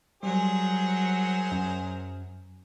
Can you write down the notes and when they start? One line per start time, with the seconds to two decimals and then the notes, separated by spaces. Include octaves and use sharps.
0.23 F#3 G3 G#4 A#4 C5
1.52 F#2